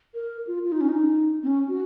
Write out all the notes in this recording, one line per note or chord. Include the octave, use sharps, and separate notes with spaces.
A#4
F4
F4
D#4
C#4
D#4
C4
C#4
F#4